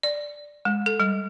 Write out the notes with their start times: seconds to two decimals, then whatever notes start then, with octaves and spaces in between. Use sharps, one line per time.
0.03 D5
0.65 G#3
0.86 A4
1.00 G3